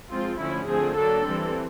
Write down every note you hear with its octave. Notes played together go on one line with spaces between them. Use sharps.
F3 G#3 C4 F4
D3 F3 A3 C#4 E4
D3 F3 A3 C4 G#4
F#3 A#3 D4 A4
E3 G3 C4